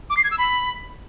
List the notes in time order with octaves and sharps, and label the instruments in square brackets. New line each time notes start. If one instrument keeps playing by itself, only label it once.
[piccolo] D6
C7
G#6
E6
B5